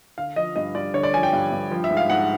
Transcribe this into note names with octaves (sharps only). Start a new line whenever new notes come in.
D3 F5
F3 D#5
G2 D#5
G2 D5
D3 C#5
D5
F3 G#5
G5
G2
G2
F3
E5
G#2
F5
G#2 F#5